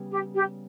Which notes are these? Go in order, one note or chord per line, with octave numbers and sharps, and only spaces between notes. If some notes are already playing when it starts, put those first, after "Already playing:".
Already playing: C#3 G3 B3
G4
G4